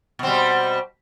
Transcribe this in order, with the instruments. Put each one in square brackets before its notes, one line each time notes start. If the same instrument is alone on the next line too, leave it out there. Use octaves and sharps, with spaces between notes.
[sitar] B2
C4
G3